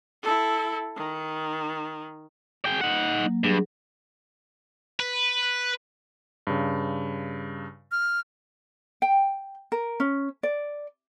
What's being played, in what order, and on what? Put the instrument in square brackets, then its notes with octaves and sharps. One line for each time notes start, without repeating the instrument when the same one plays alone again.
[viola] E4 A4
D#3
[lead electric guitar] G#4 G5
D#4 F#5
[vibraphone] F#3 A#3
[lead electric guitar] G2 [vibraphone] F#3 D4 G#4
[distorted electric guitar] B4
[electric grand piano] G2 C#3
[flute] F6
[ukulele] G5
A#4
C#4
D5